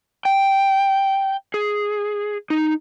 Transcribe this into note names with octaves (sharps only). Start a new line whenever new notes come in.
G5
G#4
D#4